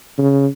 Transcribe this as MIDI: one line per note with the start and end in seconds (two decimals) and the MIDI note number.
0.18 0.47 49